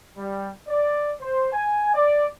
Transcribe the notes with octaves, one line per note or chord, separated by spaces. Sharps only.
G3
D5
C5
G#5
D5